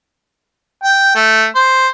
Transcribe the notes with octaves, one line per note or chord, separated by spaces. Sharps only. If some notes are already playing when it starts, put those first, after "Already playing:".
G5
A3
C5